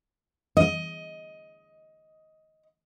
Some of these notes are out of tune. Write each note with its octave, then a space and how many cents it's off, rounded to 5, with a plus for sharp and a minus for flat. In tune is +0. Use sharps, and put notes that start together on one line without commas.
D#5 +15